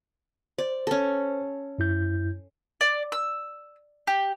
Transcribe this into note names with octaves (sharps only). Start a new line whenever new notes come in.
C5 D5
C#4 A4
F#2 E4 G6
D5
E6
G4